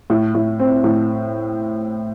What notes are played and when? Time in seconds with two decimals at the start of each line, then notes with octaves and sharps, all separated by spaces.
0.10 A2
0.35 A2
0.60 C4
0.84 A2